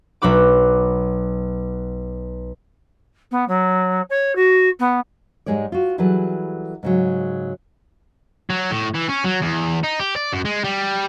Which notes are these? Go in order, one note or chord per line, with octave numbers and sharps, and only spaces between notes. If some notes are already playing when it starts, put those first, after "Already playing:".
B1 F#3 F#4 B5 D6
B3
F#3
C#5
F#4
B3
G#2 G3 G#3 C#5 D5
F4 F#4
E3 F#3 G3 G#4 A4 B4
G#2 C#3 F#3
F#3
A2
E3
C#4
F#3
E2
D#4
G4
D5
F#2
G#3
G3